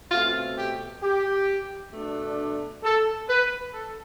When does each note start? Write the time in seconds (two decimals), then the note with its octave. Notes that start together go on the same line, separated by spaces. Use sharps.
0.11 B2 A3 C4 F4
0.58 G4
1.02 G4
1.92 B2 A3 D4
2.83 A4
3.29 B4
3.74 A4